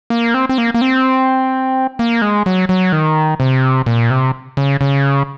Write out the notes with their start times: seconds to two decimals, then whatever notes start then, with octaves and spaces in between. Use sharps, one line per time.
0.10 A#3
0.34 C4
0.49 C4
0.58 A#3
0.74 A#3
0.81 C4
1.99 A#3
2.22 G#3
2.46 F#3
2.69 F#3
2.92 D#3
3.40 C3
3.86 A#2
4.10 C3
4.57 C#3
4.81 C#3